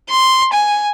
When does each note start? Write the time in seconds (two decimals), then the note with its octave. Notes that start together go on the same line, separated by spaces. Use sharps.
0.11 C6
0.53 G#5